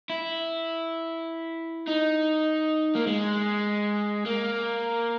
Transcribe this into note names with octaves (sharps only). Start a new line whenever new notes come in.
E4
D#4
A#3
G#3
A#3